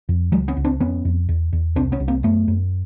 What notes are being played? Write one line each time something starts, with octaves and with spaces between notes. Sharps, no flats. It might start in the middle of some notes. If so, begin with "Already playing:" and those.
F2
C#2 F#3 G#3
B3 C#4
C#2
C4 D4
F2 B3 C#4
F2
E2
E2
C2 C4 D4
B3 C#4
C2
A#3 C4
F#2 A3 B3
F#2